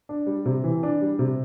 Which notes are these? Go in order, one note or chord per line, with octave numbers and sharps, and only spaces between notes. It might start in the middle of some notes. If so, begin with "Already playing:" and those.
D4
G3
C3
E3
D4
G3
C3